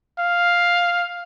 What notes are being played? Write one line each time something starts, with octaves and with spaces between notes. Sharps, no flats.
F5